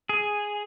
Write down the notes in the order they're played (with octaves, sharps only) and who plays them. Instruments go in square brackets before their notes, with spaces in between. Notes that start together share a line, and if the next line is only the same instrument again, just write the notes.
[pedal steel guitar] G#4